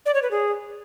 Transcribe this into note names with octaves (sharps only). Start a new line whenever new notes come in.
D5
C#5
B4
G#4